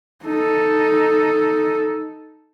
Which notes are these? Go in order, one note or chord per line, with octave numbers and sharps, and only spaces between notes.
D#4 A4